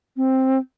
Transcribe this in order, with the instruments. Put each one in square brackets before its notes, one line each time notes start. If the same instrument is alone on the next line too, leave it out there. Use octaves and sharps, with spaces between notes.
[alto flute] C4